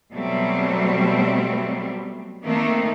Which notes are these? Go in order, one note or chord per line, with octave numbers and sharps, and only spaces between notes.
B2 F#3 G3 A3 C4
D#3 A3 A#3 C4 D#4